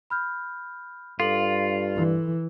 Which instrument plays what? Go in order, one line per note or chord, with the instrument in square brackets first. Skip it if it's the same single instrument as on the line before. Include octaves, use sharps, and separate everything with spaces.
[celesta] B5 F6 G6
[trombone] G2 [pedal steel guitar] F4 [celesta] A4 C6 F#7
[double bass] E3